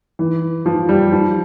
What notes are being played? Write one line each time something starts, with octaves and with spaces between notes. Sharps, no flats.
E3
F3
G3
F3